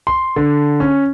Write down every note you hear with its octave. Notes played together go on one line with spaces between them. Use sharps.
C6
D3
C#4